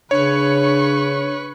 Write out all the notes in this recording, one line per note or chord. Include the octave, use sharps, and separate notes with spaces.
C#3 D4 B4 C#5 C#6